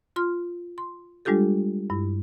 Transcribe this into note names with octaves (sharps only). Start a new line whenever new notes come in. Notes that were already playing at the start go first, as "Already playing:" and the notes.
F4 C6 F6
C6
G3 G#3 D4 F4 G4 A4
G2 E4